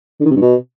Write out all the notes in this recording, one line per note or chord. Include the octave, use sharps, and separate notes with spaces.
D3
D#3
C3
G2
B2